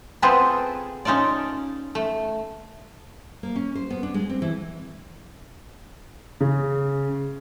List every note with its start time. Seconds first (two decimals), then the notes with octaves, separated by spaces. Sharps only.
0.22 B3 C4 F4 G#4 A4 B4
1.05 C#4 D#4 F4 A4 D5
1.95 A3
3.43 A#3
3.56 C#4
3.75 C5
3.90 B3
4.03 D4
4.14 G#3
4.29 C4
4.42 E3
6.40 C#3